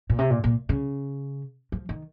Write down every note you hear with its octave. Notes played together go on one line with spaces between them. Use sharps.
A#2
C3
A#2
A#2
C#3
F3
D#3